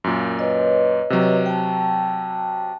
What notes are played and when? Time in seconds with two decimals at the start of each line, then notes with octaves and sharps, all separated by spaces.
0.04 F#2 A#2
0.39 B4 C#5 D#5
1.10 C3 F#3
1.46 G5 A5